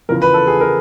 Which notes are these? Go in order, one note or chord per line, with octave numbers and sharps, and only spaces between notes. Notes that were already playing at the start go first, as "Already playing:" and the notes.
E2 C#3 F3 A#4
B4
A4
G#4
A#4